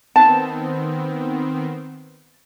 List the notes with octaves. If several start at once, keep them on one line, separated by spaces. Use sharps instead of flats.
D#3 B3 C4 A5